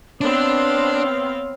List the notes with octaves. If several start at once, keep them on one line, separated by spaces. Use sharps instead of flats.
B3 C4 D4 C#5 F5